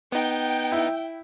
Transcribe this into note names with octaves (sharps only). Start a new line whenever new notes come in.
B3 D#4 G5
E4